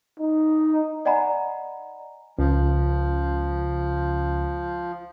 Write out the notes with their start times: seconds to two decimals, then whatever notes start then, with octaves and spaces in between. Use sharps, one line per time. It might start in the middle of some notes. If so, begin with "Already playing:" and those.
0.20 D#4
1.05 D5 D#5 F#5 G#5 A#5 B5
2.39 C#2 F3